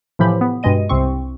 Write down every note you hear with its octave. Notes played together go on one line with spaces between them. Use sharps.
A2 C3 E3 F3 G4 B5
B3
G2 B2 G#3 D#5 D#7
C2 C3 C4 C#6